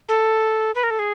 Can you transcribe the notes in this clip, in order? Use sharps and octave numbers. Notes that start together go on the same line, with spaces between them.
A4
B4
A#4
A4
G#4